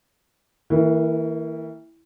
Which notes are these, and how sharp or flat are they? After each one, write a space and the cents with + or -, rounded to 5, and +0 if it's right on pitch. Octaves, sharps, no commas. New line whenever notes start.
E3 -45 A#3 -25 E4 +0